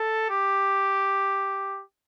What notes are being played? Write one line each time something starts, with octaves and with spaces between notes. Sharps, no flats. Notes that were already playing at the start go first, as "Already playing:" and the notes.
Already playing: A4
G4